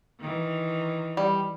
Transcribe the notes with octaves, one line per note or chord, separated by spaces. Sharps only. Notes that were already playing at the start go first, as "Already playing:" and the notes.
D#3 E3
G3